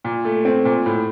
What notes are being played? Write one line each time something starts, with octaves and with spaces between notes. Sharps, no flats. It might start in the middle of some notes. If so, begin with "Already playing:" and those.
A#2
A3
C4
A#2
A2